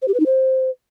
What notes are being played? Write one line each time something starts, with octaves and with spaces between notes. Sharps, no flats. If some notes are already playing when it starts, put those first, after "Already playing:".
C5
G4
B4
D#4
C5